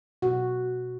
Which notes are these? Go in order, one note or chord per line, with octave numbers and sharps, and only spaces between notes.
B2 F#4